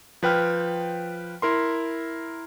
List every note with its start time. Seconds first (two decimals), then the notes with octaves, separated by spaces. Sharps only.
0.23 F3 B4 G5 F6
1.42 E4 A#4 C6